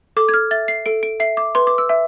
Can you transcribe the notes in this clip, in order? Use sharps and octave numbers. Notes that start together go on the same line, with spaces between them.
A4 D6
G#6
F6
E5 A6
C7
A4 D7
D7
E5 C7
D6
B4 C6
D6
E6
E5